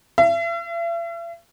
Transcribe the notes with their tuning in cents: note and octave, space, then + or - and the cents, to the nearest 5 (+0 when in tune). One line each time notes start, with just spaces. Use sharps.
E5 +45